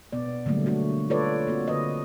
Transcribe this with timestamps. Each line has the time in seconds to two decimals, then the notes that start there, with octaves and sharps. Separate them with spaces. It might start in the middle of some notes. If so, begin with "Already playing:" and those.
0.12 B2 B3 D5
0.46 D3 F#3 G3 A3 A#3
0.66 A3 A#3 D4 F#4
1.10 F4 A4 B4 C#5 D5
1.47 A#3 C4 F#4
1.68 D3 B4 D#5